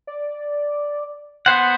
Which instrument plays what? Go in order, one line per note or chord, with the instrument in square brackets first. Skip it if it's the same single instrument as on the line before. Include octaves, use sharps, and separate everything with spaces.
[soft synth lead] D5
[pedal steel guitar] B3 C5 F#5 [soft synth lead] C6